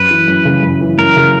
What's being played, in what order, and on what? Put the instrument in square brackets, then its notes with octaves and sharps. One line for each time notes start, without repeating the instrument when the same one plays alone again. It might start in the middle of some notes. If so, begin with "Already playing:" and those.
Already playing: [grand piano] F#2 [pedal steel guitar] B4
[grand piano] E3
F#2
C#3
F#2
E3
[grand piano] F#2 [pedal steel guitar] A#4
[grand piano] C#3